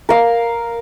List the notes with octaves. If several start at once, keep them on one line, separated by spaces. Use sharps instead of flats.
A#4 F5